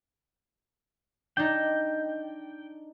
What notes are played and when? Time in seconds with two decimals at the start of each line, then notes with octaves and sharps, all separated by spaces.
1.37 D4 D#4 G5